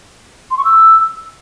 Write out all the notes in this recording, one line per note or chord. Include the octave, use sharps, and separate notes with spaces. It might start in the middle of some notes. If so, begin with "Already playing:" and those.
C6
C#6
E6